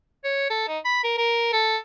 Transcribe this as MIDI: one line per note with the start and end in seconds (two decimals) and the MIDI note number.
0.24 0.47 73
0.50 0.66 69
0.68 0.78 63
0.85 1.00 83
1.04 1.16 70
1.18 1.50 70
1.53 1.77 69